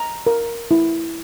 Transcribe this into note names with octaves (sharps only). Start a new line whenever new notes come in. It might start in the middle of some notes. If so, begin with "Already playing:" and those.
Already playing: A#5
A#4
E4